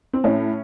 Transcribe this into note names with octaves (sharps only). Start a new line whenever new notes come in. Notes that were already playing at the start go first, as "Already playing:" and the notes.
C4
A2 C#4